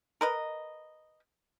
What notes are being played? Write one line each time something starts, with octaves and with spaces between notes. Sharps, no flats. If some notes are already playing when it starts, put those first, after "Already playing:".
A#4 B4 D#5